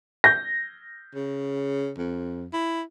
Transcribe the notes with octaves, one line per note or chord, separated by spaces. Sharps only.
G6 A#6
C#3
F2
E4